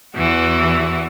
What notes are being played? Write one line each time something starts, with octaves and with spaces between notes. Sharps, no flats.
E2 E3 F#4